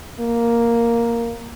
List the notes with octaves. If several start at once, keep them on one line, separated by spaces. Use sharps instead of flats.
A#3